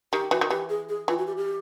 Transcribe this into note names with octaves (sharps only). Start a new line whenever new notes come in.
D#3 G4
E3 F#4
D#3
E3 G4
G#4
G#4
E3 F4
F#4
G4
G4